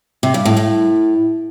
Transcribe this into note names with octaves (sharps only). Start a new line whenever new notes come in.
C3
G2
A2
A2